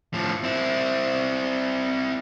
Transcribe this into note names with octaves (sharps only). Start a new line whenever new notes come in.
A2 F3
C4 E4